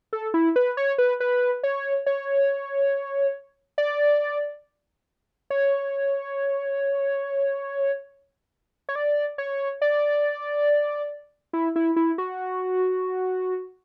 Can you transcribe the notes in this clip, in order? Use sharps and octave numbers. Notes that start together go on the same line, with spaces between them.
A4
E4
B4
C#5
B4
B4
C#5
C#5
D5
C#5
C#5
D5
C#5
D5
E4
E4
E4
F#4